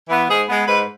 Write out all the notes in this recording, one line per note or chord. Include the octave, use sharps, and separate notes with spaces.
E3 B3
G#2 G#4
G#3 B3
G#2 B4